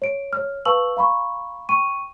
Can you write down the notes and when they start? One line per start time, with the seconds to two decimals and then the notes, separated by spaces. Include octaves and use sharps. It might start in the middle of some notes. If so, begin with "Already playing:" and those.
0.02 C#5 D7
0.33 C#5 F6
0.65 B4 F5 A5 C#6 E6 F#7
0.97 F5 A#5 B5 C#6
1.69 G5 C#6 D#7